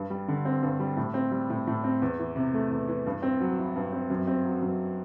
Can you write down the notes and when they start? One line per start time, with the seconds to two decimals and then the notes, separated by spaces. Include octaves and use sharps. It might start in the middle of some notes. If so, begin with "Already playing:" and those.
Already playing: G2
0.10 G3
0.28 D3
0.45 C4
0.62 G2
0.80 G3
0.97 A2
1.14 C4
1.32 G3
1.50 A2
1.67 A2
1.84 C4
2.02 E2
2.19 E3
2.36 C3
2.54 A3
2.71 E2
2.88 E3
3.06 G2
3.22 C4
3.41 F#3
3.58 E4
3.76 G2
3.92 C4
4.10 F#2
4.27 C4
4.44 F#3
4.62 F#2